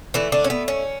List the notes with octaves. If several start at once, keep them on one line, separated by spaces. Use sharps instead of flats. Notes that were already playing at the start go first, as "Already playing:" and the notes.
D3 E3 A3 E4
D3 D4
C#4
B3
C#4